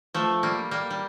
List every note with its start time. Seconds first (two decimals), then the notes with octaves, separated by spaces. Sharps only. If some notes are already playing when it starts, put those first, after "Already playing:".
0.14 F3 A3
0.43 G3 A#3
0.71 G3 A#3
0.90 G3